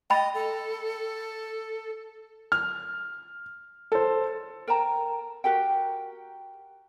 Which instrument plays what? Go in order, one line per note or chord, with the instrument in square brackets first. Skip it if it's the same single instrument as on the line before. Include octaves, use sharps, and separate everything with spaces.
[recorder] D#5 [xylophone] G5 B5 A6
[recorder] A4
[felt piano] F6
A4 C5
[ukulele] A#4 G5 A5 A#5
F#4 G4 A#4 G5